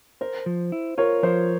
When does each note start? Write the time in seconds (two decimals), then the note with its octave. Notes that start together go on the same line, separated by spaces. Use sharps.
0.21 A#4 C5
0.46 F3
0.72 E4
0.98 F4 A#4 C#5
1.23 F3 C5